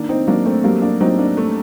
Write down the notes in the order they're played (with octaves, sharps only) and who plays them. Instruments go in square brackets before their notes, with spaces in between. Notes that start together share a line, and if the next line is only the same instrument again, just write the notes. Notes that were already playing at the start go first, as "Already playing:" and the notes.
Already playing: [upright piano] D#3 [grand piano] A#3 D4
[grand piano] C4 D#4
[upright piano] F#3 [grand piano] A#3 D4
[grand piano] A3 C4
[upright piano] F#3 [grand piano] G3 A#3
[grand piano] A#3 D4
[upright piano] F#3 [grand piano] C4 D#4
[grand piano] A#3 D4
[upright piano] A3